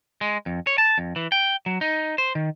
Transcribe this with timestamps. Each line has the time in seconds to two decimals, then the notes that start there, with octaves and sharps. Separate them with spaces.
0.21 G#3
0.46 F2
0.67 C#5
0.78 A5
0.98 F2
1.16 E3
1.32 G5
1.66 F#3
1.81 D#4
2.18 C5
2.35 D#3